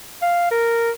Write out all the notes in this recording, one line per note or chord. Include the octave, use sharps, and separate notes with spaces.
F5
A#4